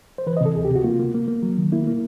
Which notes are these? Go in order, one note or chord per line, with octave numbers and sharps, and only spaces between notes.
C5
E3 B4
D#5
C3 A4
D2 G#4
G4
C3
F#4
A#3 F4
A#3
A#3
A#3
F#3
D#3
A#3 E4
A#3